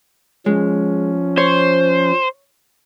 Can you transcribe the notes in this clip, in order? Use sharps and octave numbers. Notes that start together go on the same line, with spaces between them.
F3 G#3 C#4
C5 C#5